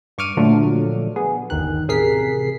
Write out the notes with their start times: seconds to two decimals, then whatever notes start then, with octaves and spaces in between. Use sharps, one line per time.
0.18 G2 C#6 D6 F6 D#7
0.37 A#2 D3 F3 F#3 A3 D4
1.16 B3 G#4
1.50 G1 D#2 D#3 F#6
1.88 A1 C3 G#4 A#4 B6 C7